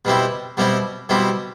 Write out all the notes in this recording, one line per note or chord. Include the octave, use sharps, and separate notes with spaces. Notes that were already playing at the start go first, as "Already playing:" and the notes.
B2 G3 C4 E4
B2 G3 C4 E4
B2 G3 C4 E4